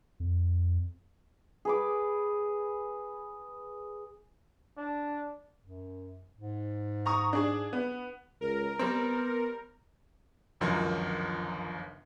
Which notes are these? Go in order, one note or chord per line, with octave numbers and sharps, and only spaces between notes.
F2
G#4 B4 D6
D4
F#2
G#2
A#5 C#6 D#6
D4 G#4
B3
C#2 A#4
G3 B3 C4
G1 C#2 F#2 D#3 F3